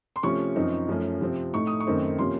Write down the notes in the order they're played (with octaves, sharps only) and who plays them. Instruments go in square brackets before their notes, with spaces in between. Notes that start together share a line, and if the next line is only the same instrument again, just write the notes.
[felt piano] C6
C3 F3 A3 C#4 C#6
F#2 F3 C4 D#4
F#2 F3 A3 C#4
C3 F3 C4
A2 A3 D#4 C#6
D#6
C#6
F#2 D#3 A3 C4 D#4
C3 F3 A#3 C#4 C6